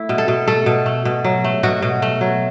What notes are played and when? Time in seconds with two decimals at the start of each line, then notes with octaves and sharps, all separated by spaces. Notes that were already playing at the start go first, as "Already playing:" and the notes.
Already playing: A3 E4
0.09 B2
0.18 A4
0.28 B2
0.48 A3 A4
0.66 B2
0.86 A3
1.05 B2
1.25 F#3
1.44 A3
1.63 B2 F#4
1.82 B2
2.02 A3
2.21 F#3